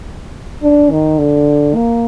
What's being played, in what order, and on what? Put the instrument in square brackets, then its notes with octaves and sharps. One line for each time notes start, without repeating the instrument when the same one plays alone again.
[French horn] D4
D#3
D3
A#3